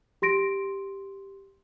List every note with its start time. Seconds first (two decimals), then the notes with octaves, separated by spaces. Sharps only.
0.22 G4 C6 A#6 D7